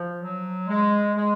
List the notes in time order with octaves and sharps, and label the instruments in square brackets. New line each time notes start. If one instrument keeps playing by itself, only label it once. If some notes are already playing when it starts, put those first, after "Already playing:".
Already playing: [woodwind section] F3
F#3
G#3
G#3